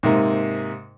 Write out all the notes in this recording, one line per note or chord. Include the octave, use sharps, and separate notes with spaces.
G#2 C3 A#3